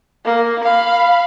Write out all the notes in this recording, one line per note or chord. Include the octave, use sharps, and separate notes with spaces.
A#3
F5 B5